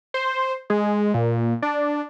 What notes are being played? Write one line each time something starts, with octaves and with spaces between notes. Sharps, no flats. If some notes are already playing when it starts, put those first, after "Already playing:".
C5
G#3
A#2
D4